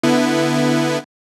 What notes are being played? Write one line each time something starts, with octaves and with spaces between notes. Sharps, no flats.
D3 B3 E4